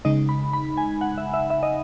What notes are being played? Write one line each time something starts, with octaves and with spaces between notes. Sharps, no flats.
C#3 G#3 D#4 D#5
B5
B5
G#5
F#5
E5
E5
E5
D#5